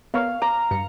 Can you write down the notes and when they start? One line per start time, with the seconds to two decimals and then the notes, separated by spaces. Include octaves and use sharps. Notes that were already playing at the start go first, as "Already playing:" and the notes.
0.14 B3 A#4 C#5 F5
0.42 A#5 D6
0.71 G2 C#7